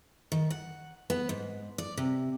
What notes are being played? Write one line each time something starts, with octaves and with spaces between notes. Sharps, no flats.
D#3
F#5
B3
G#2
D5
C3